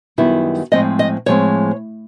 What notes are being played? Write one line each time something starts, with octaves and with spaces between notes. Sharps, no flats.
F#2 D#3 G3 B3 E4
A2 F3 G#3 C4 D#5
D#5
A2 F3 G#3 C4 C#5